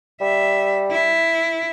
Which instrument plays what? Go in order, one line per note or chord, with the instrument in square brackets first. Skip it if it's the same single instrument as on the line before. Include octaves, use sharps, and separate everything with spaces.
[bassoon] G3 [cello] E5
[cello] E4